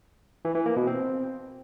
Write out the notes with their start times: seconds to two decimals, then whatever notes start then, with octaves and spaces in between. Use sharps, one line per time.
0.45 E3
0.55 E3
0.66 A#3
0.76 B2
0.87 C4